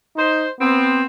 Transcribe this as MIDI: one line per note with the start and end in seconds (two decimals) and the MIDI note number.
0.17 0.47 63
0.17 0.47 72
0.60 1.04 59
0.60 1.04 60